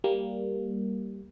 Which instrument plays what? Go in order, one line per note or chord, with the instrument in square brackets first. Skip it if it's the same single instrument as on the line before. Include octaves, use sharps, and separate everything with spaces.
[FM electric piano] G3 A#3